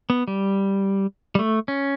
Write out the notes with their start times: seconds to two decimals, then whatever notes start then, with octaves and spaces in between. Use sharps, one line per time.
0.10 B3
0.28 G3
1.35 G3
1.39 A3
1.68 C#4